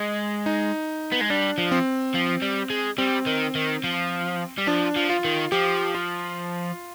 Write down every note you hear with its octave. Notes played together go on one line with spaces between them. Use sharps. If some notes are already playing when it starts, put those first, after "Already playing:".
Already playing: G#3
D#4
B3
G#3
G3 D4
F3
C4
F3
G3
G#3
G3 C4
D#3
D#3
F3
G3
F3 D4
F3
F4
D#3
F3 G4
F4